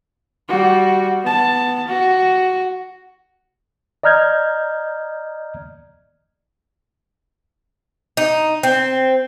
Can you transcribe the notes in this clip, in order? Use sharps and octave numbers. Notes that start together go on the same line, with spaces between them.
G3 F#4
B3 A5
F#4
D5 D#5 A#5 F6 G6 G#6
D#4
C4